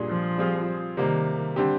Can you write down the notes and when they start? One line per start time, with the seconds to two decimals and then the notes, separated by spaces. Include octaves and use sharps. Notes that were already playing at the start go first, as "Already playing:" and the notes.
Already playing: A#2 G3 D4 F4 G#4
0.08 F3
0.38 G3 C4 F4 G#4
0.97 C3 D#3 G3 A#3
1.56 D3 G3 C4 G4